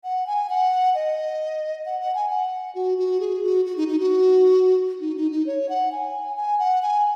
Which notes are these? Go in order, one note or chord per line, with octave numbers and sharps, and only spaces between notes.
F#5
G#5
F#5
D#5
F#5
F#5
G#5
F#5
F#4
F#4
G#4
F#4
F#4
D#4
D#4
F#4
D#4
D#4
D#4
C#5
F#5
G#5
G#5
F#5
G#5